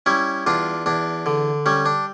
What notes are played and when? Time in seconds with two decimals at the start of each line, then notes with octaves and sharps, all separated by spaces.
0.06 G3 C#4 E4
0.46 E2 D4 F4
0.86 E2 D4
1.26 D3
1.66 G3 C#4
1.86 D4